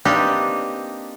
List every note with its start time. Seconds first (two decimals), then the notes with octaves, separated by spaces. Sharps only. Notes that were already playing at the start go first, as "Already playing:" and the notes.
0.05 A#3 C4 D4 D#4 G4 B4